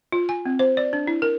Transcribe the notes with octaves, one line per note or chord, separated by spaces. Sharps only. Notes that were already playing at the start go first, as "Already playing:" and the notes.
F4
G#5
C4
C5
D5
D4
E4
A#4